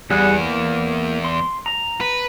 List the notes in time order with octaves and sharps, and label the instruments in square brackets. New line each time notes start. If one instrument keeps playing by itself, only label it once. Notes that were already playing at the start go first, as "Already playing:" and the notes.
[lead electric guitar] E2 [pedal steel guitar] G3 G#4 F#5
[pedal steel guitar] A#3
C6
A#5
[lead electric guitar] B4